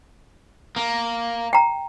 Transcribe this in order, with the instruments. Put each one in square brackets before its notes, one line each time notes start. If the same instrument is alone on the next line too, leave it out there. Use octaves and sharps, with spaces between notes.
[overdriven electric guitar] A#3
[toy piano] G5 A#5